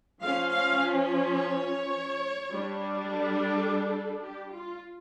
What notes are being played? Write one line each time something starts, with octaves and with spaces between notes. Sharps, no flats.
F3 C#4 F5
F5
C#5
G3 D4
A4
G4
F4